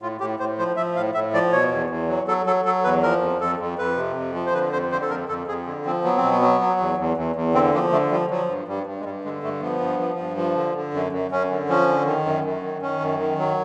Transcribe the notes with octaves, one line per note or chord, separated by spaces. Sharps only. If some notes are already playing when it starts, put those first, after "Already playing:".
A2 F4
A2 G4
A2 C5
F3 C5
F3 E5
A2 F5
A2 E5
F3 D5
B2 C#5
E2
E2
F#3
F#3 A4
F#3 A4
F#3 A4
E2 B4
F3 A#4
F2
F2 A4
F2
F2 B4
C3
F2
F3
C5
D3 B4
F2 C5
D3 C5
A4
F2 A#4
F2 A4
F2 G#4
D3
F3 C4
F#3 B3
C4
B2
B3
F#3
F#3
E2
E2
E2
E2
D3 C4
F3 A#3
D3 A3
F3 G3
F3 F#3
G2
G2 G3
G2
G#3
G2 G3
D3 G#3
G2 A3
F3 B3
G2
F3
G2
F3
D3
D3
F#2
F#2
F#2 C#4
D3
F3 C#4
D3
D#3
F#2
F#2
D#3
D#3 C#4
F#2
D#3
F#3